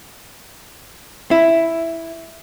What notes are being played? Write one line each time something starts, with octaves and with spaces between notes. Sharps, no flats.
E4